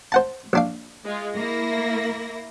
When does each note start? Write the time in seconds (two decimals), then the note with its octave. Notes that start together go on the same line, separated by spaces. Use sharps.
0.12 C5 F#5 A5
0.53 A#1 D4 F5
1.05 G#3 F4
1.36 A#3 E4 A#6